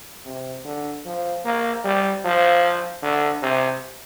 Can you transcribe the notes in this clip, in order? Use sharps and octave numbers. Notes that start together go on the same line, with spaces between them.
C3
D3
F3
A#3
G3
F3
D3
C3